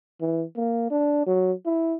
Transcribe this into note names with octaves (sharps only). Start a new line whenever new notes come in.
E3
A#3
D4
F#3
E4